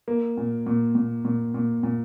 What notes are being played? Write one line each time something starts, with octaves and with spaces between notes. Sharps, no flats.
A#3
A#2
A#2
A#2
A#2
A#2
A#2